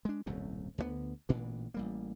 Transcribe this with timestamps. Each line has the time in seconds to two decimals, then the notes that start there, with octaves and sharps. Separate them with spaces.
0.05 G#3 D4
0.26 D#1 C2 F#2 A2
0.78 D2 D3 D#3 B3
1.29 A1 A#2 D3 E3
1.74 A1 G3 A#3